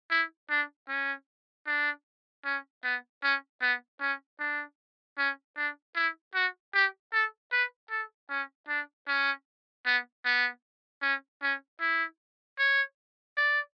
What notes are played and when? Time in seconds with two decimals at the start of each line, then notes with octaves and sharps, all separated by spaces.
0.11 E4
0.50 D4
0.89 C#4
1.67 D4
2.45 C#4
2.84 B3
3.23 C#4
3.61 B3
4.00 C#4
4.40 D4
5.18 C#4
5.56 D4
5.96 E4
6.35 F#4
6.74 G4
7.12 A4
7.52 B4
7.90 A4
8.30 C#4
8.68 D4
9.07 C#4
9.86 B3
10.24 B3
11.02 C#4
11.42 C#4
11.80 E4
12.58 C#5
13.37 D5